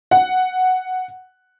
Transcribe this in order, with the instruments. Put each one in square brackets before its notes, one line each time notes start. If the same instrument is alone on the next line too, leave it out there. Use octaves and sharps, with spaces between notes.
[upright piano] F#5